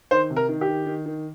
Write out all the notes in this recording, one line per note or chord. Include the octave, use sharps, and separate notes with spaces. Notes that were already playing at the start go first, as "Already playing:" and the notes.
D#3 C5
C3
A#4
D#3
G4
D#3
D#3
D#3